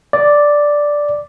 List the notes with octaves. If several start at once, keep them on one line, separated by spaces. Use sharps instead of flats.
D5